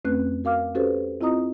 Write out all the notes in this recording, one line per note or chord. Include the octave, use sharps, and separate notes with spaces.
F2 A3 C4 C#4 B4 F#6
F#4 A#4 F5 D6 F6
C#4 F#4 G4 A4 B4 C5
C4 E4 F4 D#5 A#5 D#6